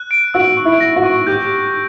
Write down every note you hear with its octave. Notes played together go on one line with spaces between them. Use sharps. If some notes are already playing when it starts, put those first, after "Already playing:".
Already playing: F#6
D7
F#4 E6
C#6
E4
A#6
F#4
C#6
G4 G6